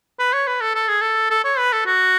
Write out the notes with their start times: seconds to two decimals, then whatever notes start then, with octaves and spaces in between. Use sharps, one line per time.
0.19 B4
0.33 C#5
0.47 B4
0.61 A4
0.75 A4
0.88 G#4
1.01 A4
1.30 A4
1.44 C#5
1.58 B4
1.72 A4
1.86 F#4